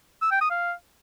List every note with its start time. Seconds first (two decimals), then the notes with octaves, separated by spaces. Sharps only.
0.22 E6
0.32 G5
0.41 D#6
0.51 F5